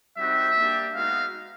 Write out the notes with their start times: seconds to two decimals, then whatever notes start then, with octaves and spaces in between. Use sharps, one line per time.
0.18 G3 C4 D#4 F#4 E5
0.56 A#3 D4 G4
0.94 G#3 B3 D#4 F#4 F5